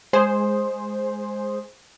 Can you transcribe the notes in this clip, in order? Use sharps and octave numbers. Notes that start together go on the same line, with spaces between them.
G#3 G#4 C5